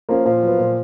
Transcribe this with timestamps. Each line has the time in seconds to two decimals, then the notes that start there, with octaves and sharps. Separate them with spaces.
0.09 F3 A#3 C#4
0.25 A#2 F3
0.43 F#3 B3
0.59 A#2